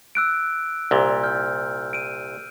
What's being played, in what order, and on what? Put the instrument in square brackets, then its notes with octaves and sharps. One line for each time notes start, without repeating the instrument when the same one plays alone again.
[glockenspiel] E6 F#6 D7
[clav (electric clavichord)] C2 A#2
[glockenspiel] F6 G6
D7 D#7